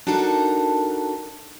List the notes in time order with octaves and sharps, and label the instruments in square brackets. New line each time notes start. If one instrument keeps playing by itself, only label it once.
[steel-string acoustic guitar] D4 D#4 F#4 A4 A#4 A5